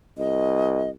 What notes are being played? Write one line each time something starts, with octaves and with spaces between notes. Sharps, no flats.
C2 D#5